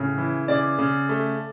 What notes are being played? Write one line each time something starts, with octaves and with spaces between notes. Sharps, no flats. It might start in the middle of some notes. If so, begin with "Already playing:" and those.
Already playing: A2 C#3
E3
C#3 D5
C#3
A3